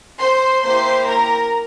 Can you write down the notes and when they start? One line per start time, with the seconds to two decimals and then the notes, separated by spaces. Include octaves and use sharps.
0.19 C5 C6
0.63 A#3 E4 G4 C5 C6
1.07 A#4 A#5